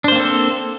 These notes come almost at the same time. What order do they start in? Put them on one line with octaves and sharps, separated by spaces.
D4 C5 A#3 C4 A4